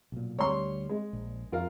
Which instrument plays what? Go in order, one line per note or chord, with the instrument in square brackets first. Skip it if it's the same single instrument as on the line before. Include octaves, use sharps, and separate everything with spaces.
[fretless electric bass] B1 A#2
[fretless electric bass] D2 G3 [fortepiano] C#5 C6
[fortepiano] G#3
[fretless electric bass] A#1
[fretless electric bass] F2 [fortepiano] F4 A#4 F5